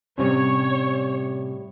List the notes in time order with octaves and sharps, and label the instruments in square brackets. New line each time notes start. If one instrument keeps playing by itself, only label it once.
[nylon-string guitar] A2 G3 [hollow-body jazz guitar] C3 C4 C#4 [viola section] C#5